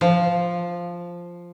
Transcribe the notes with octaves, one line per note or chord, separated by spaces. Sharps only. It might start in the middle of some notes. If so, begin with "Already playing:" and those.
F3